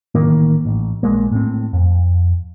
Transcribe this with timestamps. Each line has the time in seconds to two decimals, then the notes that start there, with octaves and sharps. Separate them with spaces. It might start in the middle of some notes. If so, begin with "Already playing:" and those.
0.15 A1 D#3 A#3
0.65 A1
1.03 A#1 G#3 A#3
1.32 A2 C4
1.73 F2